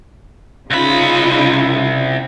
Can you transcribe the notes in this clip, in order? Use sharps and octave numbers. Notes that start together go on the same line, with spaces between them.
C2 C#3 D#4 F4 B5